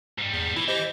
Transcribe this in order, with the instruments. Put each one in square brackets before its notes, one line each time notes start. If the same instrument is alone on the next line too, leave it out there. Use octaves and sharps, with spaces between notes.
[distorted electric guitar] G#2 G3
[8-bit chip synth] E2
[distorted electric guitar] E3 [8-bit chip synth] E4
[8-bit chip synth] G4 C5 D#5